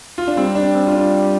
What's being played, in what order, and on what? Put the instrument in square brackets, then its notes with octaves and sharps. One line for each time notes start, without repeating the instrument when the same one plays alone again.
[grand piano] F4
D4
[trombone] G3 [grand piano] C4
[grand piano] D4
C4
F4
D4